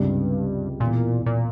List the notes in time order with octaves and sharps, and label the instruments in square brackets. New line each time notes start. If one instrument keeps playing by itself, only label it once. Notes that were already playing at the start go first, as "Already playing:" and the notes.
Already playing: [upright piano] C#2 C3 G3 [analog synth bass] G2
[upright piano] E1 E2 E3 [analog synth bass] A#2
[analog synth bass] A#2